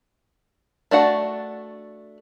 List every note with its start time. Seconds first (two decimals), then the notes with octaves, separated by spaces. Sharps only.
0.91 A3 D4 F#4 F#5